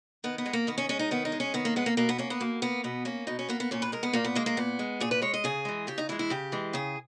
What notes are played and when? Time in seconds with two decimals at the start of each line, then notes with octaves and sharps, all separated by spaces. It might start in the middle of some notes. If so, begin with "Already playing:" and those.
0.24 D#3 B3
0.38 B3
0.46 G#3
0.53 A#3
0.67 D#3 B3
0.78 C#4
0.89 G#3 C#4
0.99 D#4
1.11 D#3 B3
1.25 D#4
1.32 G#3
1.40 C#4
1.54 D#3 B3
1.65 A#3
1.76 G#3 B3
1.86 A#3
1.97 B2 A#3
2.09 B3
2.18 A#3 C#4
2.30 B3
2.40 B2 A#3
2.62 A#3 B3
2.84 B2 B3
3.05 A#3 C#4
3.27 B2 D#4
3.39 C#4
3.49 A#3 B3
3.60 B3
3.71 A#2 C#4
3.82 B4
3.92 G#3 A#4
4.03 B3
4.13 A#2 A#3
4.24 B3
4.35 G#3 A#3
4.46 A#3
4.57 A#2 B3
4.79 G#3
5.00 A#2 G#4
5.11 B4
5.22 G#3 C#5
5.34 D#5
5.44 C#3 G#4
5.65 E3 G#3
5.87 C#3 G4
5.98 D#4
6.09 E3 G#3 E4
6.19 E4
6.30 C#3 G4
6.52 E3 G#3
6.73 C#3 G#4